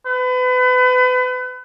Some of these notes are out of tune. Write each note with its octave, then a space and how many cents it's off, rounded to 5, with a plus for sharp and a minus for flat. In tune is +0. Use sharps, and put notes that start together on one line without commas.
B4 +35